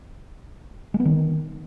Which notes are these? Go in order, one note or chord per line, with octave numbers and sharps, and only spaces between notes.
G#3
B3
D#3